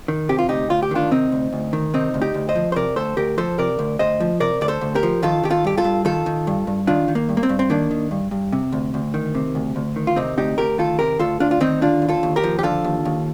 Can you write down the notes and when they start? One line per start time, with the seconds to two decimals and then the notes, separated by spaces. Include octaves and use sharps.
0.08 D#3
0.29 C3 G4
0.39 F4
0.49 D2 D#4 G4
0.70 D2 F4
0.83 G4
0.91 D#3 D4 F4
1.11 C3 C4 D#4
1.32 D2
1.53 D2
1.73 D#3
1.94 C3 C4 D#4
2.14 D2
2.21 D#4 G4
2.34 D2
2.49 C5 D#5
2.55 F3
2.72 C5
2.76 C3 A#4 D5
2.96 D2 A4 C5
3.17 D2 G4 A#4
3.38 F3 A4 C5
3.58 C3 A#4 D5
3.79 D2
3.99 D2 C5 D#5
4.20 F3
4.40 C3 A#4 D5
4.61 D2 D5
4.68 A4 C5
4.81 D2
4.95 G4 A#4
5.03 F3
5.23 D#3 F4 A4
5.44 D#3 G4
5.51 F4 A4
5.65 G2 G4
5.77 F4 A4
5.84 G2
6.05 D#3 F4 A4
6.26 D#3
6.47 G2
6.67 G2
6.87 D#3 D4 F4
7.08 D#3
7.15 A#3
7.29 G2
7.37 A#3
7.43 C4
7.49 G2
7.59 C4
7.70 D#3 A#3 D4
7.91 D#3
8.11 G2
8.31 G2
8.53 C3
8.72 D2
8.94 D2
9.14 D#3
9.35 C3
9.55 D2
9.76 D2
9.96 D#3
10.07 F4
10.16 C3 C4 D#4
10.37 D2 D#4 G4
10.58 D2 G4 A#4
10.78 D#3 F4 A4
10.99 C3 G4 A#4
11.19 D2 F4 A4
11.40 D2 D4 F4
11.51 F4
11.60 D#3 C4 D#4
11.81 D3 D4 F4
12.02 D#2
12.09 F4 A4
12.23 D#2
12.36 G4 A#4
12.44 F3
12.59 G4
12.63 D3 F4 A4
12.84 D#2
13.05 D#2